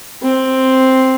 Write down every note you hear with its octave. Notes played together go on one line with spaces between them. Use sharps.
C4